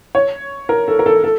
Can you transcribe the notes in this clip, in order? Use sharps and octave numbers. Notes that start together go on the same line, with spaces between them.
C#5
A#4
A4
A#4
A4
A4